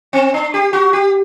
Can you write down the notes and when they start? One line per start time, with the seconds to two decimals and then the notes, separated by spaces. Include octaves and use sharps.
0.13 C4
0.34 D4
0.54 G4
0.73 F#4
0.93 G4